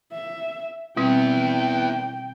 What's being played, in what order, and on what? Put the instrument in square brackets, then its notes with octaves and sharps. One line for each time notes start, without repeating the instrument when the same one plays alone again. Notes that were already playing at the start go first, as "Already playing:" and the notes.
[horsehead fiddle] E5
[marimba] B2 G3 C4 [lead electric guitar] B3 E4 [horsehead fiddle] G5